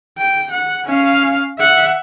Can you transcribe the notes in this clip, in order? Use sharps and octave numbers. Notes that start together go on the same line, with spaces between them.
G5
F#5
C#4 F5
E5 F#5